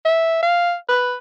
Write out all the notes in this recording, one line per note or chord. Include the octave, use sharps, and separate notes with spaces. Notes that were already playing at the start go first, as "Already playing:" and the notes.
E5
F5
B4